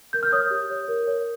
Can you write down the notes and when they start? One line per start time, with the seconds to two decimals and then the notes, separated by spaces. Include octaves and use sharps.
0.13 A#4 G6
0.23 F6
0.31 C#5 D#6 G6
0.51 G4
0.70 C#5
0.88 A#4
1.07 C#5